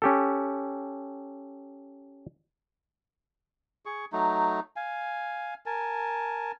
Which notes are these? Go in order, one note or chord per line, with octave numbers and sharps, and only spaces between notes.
C#4 G4 A4
G#4 C#6
F#3 A3 D#4
F5 G#5
A#4 G#5 A5